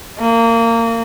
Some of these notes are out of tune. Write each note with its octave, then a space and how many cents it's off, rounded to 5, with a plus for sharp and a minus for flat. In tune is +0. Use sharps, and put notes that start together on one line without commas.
A#3 -25